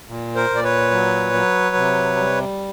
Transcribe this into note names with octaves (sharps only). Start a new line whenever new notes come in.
A#2
A#4 C5
A#2
D5
B4 C#5
F#3
F#3
C3
G3